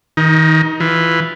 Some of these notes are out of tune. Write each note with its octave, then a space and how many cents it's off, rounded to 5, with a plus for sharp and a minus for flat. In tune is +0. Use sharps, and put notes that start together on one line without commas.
D#3 +30 D#4 +0
E3 +0 F4 +0